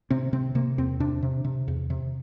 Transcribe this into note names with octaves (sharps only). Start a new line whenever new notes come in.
C3 C4
C3 C4
C3 A#3
E2 C4
C3 D4
C3
C3
E2
C3